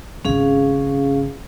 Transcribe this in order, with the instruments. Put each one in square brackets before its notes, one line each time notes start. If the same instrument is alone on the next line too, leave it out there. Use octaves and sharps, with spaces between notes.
[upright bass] G#1 C#3 [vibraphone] C#4 G#4 F5